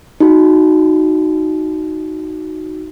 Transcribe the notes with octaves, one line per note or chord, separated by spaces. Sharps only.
D#4 F#4